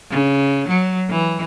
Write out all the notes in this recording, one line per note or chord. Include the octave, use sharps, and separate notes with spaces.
C#3
F#3
E3